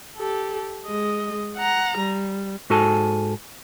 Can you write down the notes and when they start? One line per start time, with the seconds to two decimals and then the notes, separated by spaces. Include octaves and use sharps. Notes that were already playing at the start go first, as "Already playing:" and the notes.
0.16 G4 A4
0.86 G#3 D#5
1.57 F#5 A#5
1.98 G3
2.70 G#2 F#4 A4 G#5 A5